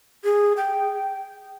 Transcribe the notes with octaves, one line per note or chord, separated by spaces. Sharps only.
G#4
G5